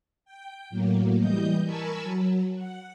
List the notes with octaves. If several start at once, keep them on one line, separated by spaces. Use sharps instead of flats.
G5
A2 F#3 A#3
E3 G3 D#5 G6
A#4 G#5 A5 B5 C#6 E6
F#3
F#5